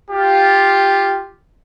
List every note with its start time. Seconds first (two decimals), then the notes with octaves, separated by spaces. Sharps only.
0.11 F4 G4